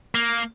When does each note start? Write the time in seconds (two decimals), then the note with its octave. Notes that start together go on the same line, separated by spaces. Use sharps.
0.15 A#3